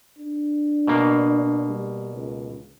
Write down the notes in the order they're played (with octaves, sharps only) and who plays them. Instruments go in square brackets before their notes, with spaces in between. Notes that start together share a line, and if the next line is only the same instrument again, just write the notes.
[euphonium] D4
[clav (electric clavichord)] B2 A#3
[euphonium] G3
C#2